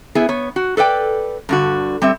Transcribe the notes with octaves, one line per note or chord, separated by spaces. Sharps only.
B3 E4 G#4
B3 C#5
F#4
A4 B4 D5 G5
G2 D3 F#4
G3 C4 E5